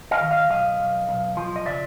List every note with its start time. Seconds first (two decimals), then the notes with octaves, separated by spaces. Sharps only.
0.11 D#5 F5
0.21 D#3
0.31 D#5 F5
0.50 B1 D#5 F5
0.80 B1
1.09 B1
1.37 F3
1.56 D#5
1.66 C#3 D5 E5